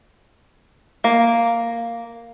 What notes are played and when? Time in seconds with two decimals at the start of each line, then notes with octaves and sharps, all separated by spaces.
1.04 A#3